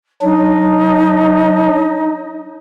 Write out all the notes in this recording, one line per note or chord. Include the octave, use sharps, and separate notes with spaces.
F#3 D4 D#4